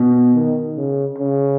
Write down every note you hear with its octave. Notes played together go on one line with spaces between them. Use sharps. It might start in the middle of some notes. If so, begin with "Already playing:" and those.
Already playing: B2
D#3
C#3
C#3